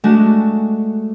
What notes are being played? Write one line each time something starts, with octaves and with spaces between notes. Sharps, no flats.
G#3 A3 D4 F#4